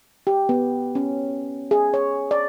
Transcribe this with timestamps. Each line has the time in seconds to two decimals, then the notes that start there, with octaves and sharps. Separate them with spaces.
0.27 G4
0.49 B3
0.95 C#4
1.71 G#4
1.94 C#5
2.31 D5